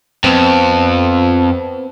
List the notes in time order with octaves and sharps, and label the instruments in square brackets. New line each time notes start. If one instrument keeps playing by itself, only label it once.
[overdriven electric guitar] F2 [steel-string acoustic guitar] B3 C4